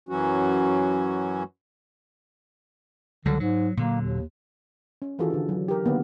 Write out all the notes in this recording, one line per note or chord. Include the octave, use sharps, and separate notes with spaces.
F#2 E3 F#3 C#4 F#4
C#2 D3 F#3 G3
G#2 F#3
A#2 D3 F#3 A#3
D#2
C#4
D#3 E3 F4 F#4 G#4 A4
D3 D4
F#3
G4 A#4
D3 D#3 A#3 B3